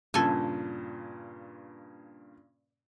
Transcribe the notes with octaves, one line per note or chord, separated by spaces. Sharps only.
G2 A#2 C#3 A4 G#5